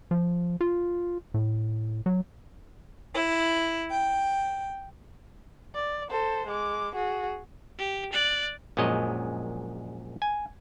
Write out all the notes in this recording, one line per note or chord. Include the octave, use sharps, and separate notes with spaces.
F3
F4
A2
F#3
E4
G5
D5
A4 C5
G#3 D6
F#4 G#4
G4
D5 F#6
A#1 F#2 A#2 G#3 C#5 D#5
G#5